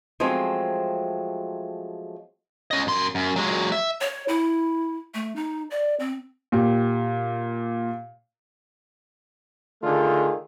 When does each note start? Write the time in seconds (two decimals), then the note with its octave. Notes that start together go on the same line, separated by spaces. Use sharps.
0.20 F3 F#3 G#3 A3 C4
2.71 C#4 D#5
2.87 F#2 C6
3.15 F#2
3.36 F#3 G#3
3.72 E5
4.01 C#5
4.28 E4
5.14 A3
5.36 D#4
5.71 D5
6.00 C4
6.52 A#2 G4
9.82 D3 D#3 A3 F4 G#4